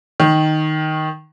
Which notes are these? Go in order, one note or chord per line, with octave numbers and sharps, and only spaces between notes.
D#3